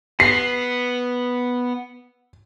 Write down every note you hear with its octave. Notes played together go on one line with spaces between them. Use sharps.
B3 C7